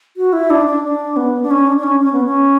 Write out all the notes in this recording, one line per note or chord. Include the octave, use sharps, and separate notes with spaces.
F#4
E4
D4
D4
D4
B3
D4
C#4
D4
D4
C#4
C#4
B3
C#4